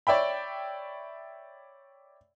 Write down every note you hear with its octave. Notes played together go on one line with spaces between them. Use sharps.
C#5 D5 E5 G5 B5